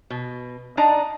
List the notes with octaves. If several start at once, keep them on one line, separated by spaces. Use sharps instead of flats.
B2
D4 D#4 D5 D#5 A#5